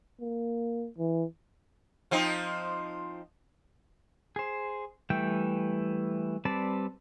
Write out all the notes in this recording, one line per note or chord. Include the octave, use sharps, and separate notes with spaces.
A#3
E3
F3 C4 D#4
G#4 C5
E3 G3 A3 G5
G3 C4 B4 D5 A5